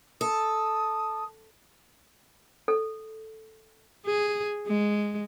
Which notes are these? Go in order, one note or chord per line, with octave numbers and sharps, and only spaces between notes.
A4 D#6
A4
G#4
G#3